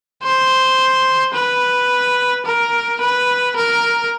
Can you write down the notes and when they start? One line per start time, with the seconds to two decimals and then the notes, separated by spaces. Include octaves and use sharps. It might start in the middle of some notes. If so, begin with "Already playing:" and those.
0.23 C5
1.34 B4
2.46 A#4
3.01 B4
3.56 A#4